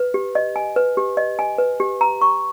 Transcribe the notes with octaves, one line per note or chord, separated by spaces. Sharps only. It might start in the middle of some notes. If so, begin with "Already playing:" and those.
Already playing: B4
G4
D#5
G#5
B4
G4
D#5
G#5
B4
G4
A#5
C#6